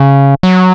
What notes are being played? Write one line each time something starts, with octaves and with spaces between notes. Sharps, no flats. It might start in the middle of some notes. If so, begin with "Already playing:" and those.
Already playing: C#3
F#3